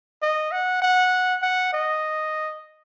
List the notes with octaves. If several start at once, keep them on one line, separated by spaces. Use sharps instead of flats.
D#5
F#5
F#5
F#5
D#5